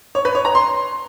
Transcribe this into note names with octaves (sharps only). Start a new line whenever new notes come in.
C#5
B4
C#5
A#5
C6